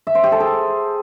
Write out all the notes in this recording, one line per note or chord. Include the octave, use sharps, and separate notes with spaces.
E5
C5
G4
A4
G#4